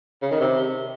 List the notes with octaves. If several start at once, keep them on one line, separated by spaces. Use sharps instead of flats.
C#3
D#3
C3